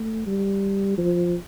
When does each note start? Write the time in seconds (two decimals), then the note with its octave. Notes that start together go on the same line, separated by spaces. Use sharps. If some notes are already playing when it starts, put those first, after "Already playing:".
Already playing: A3
0.26 G3
0.98 F3